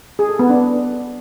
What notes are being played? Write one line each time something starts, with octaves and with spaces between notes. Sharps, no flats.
G#4
A4
B3
D4